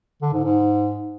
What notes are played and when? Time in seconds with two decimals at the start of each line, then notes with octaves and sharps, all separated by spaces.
0.22 D3
0.33 G#2
0.44 G#2